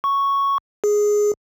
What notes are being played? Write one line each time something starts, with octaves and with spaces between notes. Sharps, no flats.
C#6
G#4